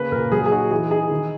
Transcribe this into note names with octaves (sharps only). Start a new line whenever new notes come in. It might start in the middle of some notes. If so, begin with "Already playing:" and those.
Already playing: C#3 A#3 B4
A#2 A#4
F#3 G#4
G#4
D#4 F#4
E3 G#4
D#4 G#4
D#3